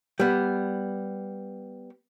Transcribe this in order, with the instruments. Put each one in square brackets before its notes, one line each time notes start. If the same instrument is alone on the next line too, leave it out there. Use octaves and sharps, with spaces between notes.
[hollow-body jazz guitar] G3 B3